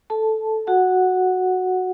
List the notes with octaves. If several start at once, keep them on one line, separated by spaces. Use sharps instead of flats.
A4 A5
F#4 F#5